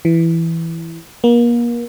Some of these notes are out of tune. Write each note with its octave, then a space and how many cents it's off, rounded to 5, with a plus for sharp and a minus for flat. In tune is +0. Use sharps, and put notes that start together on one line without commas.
E3 +5
A#3 +35